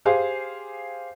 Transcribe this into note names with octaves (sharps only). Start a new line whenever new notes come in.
G4 G#4 C5 F5 G#5